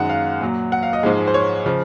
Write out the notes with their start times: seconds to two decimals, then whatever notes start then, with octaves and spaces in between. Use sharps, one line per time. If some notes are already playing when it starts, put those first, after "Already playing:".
Already playing: F#2 D#3 G#3 F#5
0.09 F5
0.41 A#2 F#3
0.72 F#5
0.83 F5
0.93 D#5
1.03 G#2 F3 G#3
1.27 C5
1.34 C#5
1.66 C#3 F3